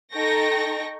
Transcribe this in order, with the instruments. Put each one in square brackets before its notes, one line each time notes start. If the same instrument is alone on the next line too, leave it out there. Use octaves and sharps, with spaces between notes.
[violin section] D#4 A4 G5 C#6 A#6